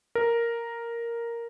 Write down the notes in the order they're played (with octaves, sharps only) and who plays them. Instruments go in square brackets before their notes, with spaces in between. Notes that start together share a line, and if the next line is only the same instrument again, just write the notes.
[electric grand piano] A#4